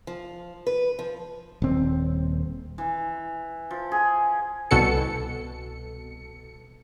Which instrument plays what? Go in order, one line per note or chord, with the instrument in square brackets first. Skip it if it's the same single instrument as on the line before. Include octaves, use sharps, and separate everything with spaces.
[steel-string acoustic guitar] F3
B4
F3
[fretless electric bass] D#1 C4
[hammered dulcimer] E3
F3
G#4
[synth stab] C2 B2 A4 C#7